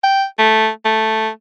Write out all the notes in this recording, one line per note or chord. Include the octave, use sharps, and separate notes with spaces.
G5
A3
A3